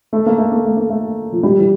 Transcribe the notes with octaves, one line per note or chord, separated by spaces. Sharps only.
A3
A#3
A3
A#3
A3
A#3
A3
F3
G3
E3